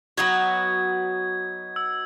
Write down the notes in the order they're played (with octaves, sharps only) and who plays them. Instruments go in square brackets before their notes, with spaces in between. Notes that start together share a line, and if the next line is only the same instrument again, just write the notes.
[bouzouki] F#3 B3 D#4 F#4 [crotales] G#6
[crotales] E6